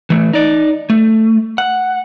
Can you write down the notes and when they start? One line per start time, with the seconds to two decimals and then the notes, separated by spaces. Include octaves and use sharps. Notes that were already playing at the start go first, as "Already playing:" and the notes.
0.10 E3 A3
0.33 D#4 D5
0.90 A3
1.58 F#5